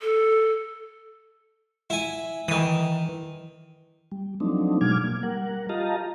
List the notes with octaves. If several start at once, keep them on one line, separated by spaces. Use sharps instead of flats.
A4
E4 G#5
D#3 E3 D#6
G3
F3 F#3 A3 C4 D4 D#4
B2 F#3 G#3 D6 F6 G#6
A#3
G3 A#4 F#5
F4 G4 D#5 F5 A5 A#5